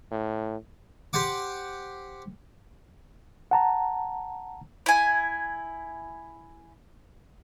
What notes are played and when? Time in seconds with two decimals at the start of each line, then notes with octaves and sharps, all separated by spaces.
0.12 A2
1.13 G4 C5 F#5 D6
3.51 F#5 A5 A#5
4.86 E4 G#5